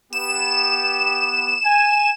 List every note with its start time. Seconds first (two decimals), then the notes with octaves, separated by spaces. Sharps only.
0.13 B3 G4 E7
1.65 G#5